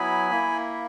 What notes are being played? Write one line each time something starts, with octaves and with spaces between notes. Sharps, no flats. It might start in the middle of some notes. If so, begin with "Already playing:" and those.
Already playing: F#3 B3 E4 G#5 B5
A#3 E4